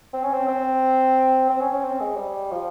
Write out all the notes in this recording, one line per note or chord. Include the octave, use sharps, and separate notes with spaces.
C4
C#4
C4
C4
C4
C#4
C#4
C4
G#3
G3
F3